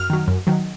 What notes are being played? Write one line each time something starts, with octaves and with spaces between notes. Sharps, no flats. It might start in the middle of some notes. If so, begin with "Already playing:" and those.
Already playing: F#2 F6
D#3 F#3
F#2
D#3 F#3